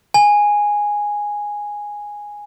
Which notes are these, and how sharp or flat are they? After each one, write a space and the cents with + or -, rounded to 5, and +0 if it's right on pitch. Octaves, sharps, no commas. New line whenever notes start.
G#5 -5